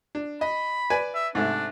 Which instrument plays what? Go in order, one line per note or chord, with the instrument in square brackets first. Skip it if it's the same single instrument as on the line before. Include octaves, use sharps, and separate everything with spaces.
[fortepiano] D4
[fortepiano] D#5 [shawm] B5
[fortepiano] B4 D5 G#5
[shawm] E5
[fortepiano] G#2 C3 A3 [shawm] D4